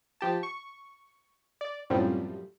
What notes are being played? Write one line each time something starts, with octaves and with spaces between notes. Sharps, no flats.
F3 G4 A5
C#6
D5
F#2 A2 C3 F3 G3